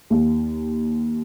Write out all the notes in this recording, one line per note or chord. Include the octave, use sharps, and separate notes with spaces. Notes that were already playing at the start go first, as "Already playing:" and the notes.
D#2